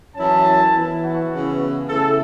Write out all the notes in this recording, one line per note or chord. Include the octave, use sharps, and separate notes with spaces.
F#2 E3 C#4 E4 A5
E3 B3 E4
F#4
C#3 E3 B3 E4
C#3 A3 E4 A4